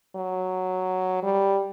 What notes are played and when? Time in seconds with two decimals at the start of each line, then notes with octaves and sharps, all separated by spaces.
0.16 F#3
1.23 G3